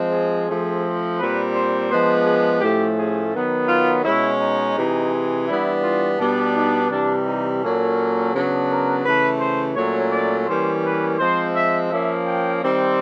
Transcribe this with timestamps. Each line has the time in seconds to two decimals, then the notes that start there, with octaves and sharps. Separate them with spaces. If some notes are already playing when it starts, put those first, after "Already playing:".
Already playing: F3 G#3 C4
0.11 G#4
0.48 F3 A3 C4
1.19 A#2 G3 C4 B4
1.54 C5
1.90 F3 G#3 B3 D4 C5
2.26 G#4
2.61 A2 F3 A3 C#4 G4
2.97 G#4
3.34 D#3 F#3 B3
3.68 F4
4.04 B2 G#3 C#4 E4
4.40 D#4
4.76 C3 E3 G#3
5.47 E3 G3 B3 D4 E4
5.83 F4
6.19 B2 G3 B3 D4
6.55 D#4
6.90 C3 E3 G3 D4
7.26 D#4
7.62 A#2 F#3 A#3 C#4 A4
8.33 C#3 F#3 B3 D4
8.68 A#4
9.04 C#3 E3 A3 B4
9.40 C5
9.76 A#2 F#3 A3 C#4 C#5
10.12 D5
10.47 E3 G3 A#3 C#4 C5
10.83 B4
11.19 F3 G#3 C4 C5
11.55 E5
11.90 F3 A#3 C#4 E5
12.26 G5
12.62 D#3 G3 C4